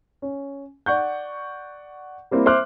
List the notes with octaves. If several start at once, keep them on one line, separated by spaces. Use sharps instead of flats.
C#4
D5 F#5 C#6 G6
G3 A#3 C4 E4
C5 E5 C6 D6 F6 F#6